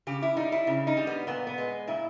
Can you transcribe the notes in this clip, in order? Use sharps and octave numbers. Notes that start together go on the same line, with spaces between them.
C#3 G4
E4
G3 D#4
E4
C#3
D#4
G3
B3
A#2 B3
B3
G#3
A#2 E4